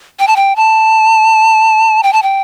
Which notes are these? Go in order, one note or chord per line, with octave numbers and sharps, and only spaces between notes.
G5
A5
G5
A5
G5
A5
G5